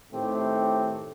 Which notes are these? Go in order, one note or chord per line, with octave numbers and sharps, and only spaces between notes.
A2 D#3 A3 C4 G4